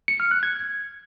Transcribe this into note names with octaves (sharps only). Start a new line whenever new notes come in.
C#7
F6
F#6
G#6